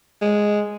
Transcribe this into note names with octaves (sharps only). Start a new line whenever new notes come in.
G#3